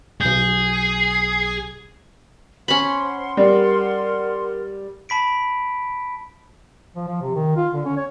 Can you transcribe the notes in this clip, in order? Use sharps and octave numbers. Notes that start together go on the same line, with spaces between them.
B1 G#4 G6
C#4 C5 F#5 B5 C6
G3 A#4
A5 B5 B6 D7
F3
F3
C3
D#3
F4
D3
C#4
C#5